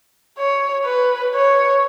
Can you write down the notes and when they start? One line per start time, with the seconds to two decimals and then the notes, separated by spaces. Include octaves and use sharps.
0.38 C#5
0.85 B4
1.35 C#5